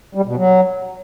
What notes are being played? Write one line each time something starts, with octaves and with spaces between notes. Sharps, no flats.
G3
B2
F#3